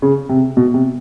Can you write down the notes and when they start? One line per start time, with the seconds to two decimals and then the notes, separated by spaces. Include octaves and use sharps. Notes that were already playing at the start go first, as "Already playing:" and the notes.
0.02 C#3
0.29 C3
0.57 B2
0.74 C3